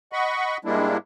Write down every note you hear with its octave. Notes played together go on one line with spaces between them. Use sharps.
D#5 F#5 B5 C#6
G#2 G3 G#3 A#3 D4 E4